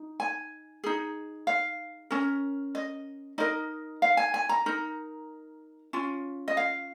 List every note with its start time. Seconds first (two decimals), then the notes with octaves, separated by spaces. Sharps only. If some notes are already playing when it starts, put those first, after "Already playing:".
Already playing: D#4
0.20 G#5
0.84 D#4 G#4
1.47 F5
2.11 C#4 A#4
2.75 D#5
3.38 D#4 A#4 D#5
4.02 F5
4.17 G#5
4.34 G#5
4.49 A#5
4.66 D#4 A#4
5.93 C#4 F4
6.48 D#5
6.57 F5